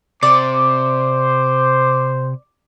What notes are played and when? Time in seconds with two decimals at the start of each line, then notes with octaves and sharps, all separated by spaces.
0.23 C3 C5 D5 D6